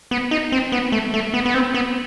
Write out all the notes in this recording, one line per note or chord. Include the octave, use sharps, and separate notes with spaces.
B3
D#4
C4
B3
A3
A3
B3
B3
C4
B3